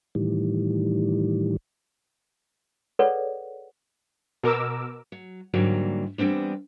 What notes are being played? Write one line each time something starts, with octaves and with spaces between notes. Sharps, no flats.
A2 D#3 E3 G3
G#4 A4 B4 C#5 D5 F#5
B2 A#4 D6 E6
F#3
G#2 D3 E3 F#3 G3 A#3
E3 G3 B3 C4 D4